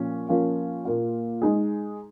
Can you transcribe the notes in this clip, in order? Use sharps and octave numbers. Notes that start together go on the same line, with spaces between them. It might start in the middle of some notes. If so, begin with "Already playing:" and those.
Already playing: A#2 F3 C#4
F3 A#3 C#4 F4
A#2 A#3 F4
G#3 D#4 G#4